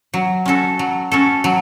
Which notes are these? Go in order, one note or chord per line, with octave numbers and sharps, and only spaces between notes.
F#3
C#4 F#4 A4
F#3
C#4 F#4 A4
F#3